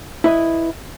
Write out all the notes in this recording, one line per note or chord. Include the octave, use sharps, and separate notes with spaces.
E4 B4 D#5